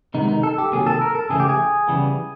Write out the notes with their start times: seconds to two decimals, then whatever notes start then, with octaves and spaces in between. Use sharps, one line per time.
0.14 C3 D#3 G#3 B3 D#4
0.28 D#4
0.43 A4
0.58 G4
0.72 C3 D#3 F#3 A#3 G#4
0.87 A4
1.01 A#4
1.15 A4
1.30 C#3 E3 A3 G#4
1.40 G4
1.49 G#4
1.88 C#3 E3 G3 B3